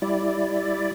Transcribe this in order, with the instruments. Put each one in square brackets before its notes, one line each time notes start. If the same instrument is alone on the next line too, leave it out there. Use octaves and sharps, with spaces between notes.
[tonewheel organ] G3 E4 D5